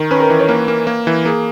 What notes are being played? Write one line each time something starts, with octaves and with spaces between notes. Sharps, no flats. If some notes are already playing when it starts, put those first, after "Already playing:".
Already playing: D#3 A#4
C#4 B4
A#4
E3
C#5
A#3 B4
A#3
A#3
E3
A#3 G#4